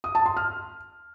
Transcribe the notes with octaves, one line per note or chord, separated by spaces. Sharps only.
D#6
A5
C6
F6